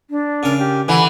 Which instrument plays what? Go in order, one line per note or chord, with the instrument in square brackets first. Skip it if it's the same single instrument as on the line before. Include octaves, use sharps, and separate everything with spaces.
[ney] D4
[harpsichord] C#3 A#4
[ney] G4
[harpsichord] D3 [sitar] E3 [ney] B5